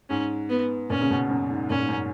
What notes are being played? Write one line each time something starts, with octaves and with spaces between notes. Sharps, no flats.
G#2 C#4
B3
A#2 C#4
C#3
B2
F#2
G#2
A#2 C#4
G#2
F#2